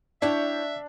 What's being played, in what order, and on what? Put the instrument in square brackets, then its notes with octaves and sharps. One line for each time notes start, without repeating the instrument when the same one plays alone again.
[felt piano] D4 [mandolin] E4 C#5 G5 [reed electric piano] D5 [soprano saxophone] E5